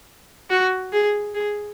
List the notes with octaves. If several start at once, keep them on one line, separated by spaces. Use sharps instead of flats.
F#4
G#4
G#4